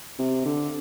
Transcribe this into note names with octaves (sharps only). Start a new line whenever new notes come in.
C3
D3